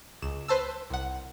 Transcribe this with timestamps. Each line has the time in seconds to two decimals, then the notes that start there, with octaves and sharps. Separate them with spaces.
0.22 C#2 E7
0.48 B4 C5 A5 E6
0.90 C2 F#5